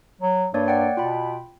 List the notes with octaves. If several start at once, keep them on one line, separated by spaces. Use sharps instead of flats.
F#3
G2 A#3 C#5 D5
D5 F#5 G5
B2 F4 G5 B5